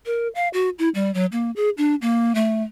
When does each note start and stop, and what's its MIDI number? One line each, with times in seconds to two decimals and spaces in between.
0.06 0.28 70
0.35 0.48 77
0.53 0.69 66
0.79 0.89 64
0.95 1.13 55
1.14 1.26 54
1.32 1.51 58
1.56 1.70 68
1.78 1.95 62
2.02 2.35 58
2.35 2.63 57